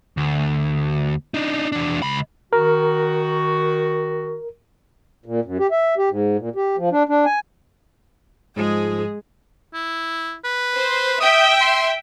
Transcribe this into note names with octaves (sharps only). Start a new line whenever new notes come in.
D2
D4 D#4
E2 D4
C#2 B5
D#3 F#4 A#4
A#2
F#2
G4
E5
G4
G#2
A#2
G4
F3
D4
D4
G#5
G#2 F3 G#3 G#4
E4
B4
C5
E5 G5 D#6
C6